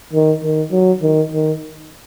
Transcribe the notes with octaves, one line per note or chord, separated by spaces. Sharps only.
D#3
D#3
F#3
D#3
D#3